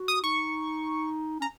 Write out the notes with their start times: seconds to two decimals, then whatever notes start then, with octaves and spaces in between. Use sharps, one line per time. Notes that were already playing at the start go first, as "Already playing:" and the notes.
Already playing: F#4
0.08 D#6
0.23 D#4 C#6
1.40 C#4 A#5